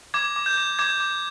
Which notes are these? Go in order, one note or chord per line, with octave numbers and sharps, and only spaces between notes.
D6 G#6
D6
G6
D6
D6 G#6
D6